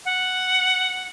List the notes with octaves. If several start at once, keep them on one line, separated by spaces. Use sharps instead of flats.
F#5